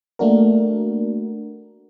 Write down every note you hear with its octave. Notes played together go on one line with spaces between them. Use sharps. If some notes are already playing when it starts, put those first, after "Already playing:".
A3 A#3 D4 F#4 A#4